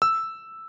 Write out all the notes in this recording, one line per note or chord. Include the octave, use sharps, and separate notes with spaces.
E6